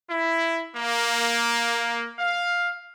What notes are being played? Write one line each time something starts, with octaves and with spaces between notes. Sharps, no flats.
E4
A#3
F5